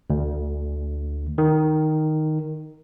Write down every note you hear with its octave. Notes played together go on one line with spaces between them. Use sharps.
D2
D#3